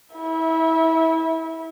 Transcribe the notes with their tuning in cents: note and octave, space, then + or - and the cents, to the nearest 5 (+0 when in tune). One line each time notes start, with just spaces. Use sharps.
E4 -30 E5 -15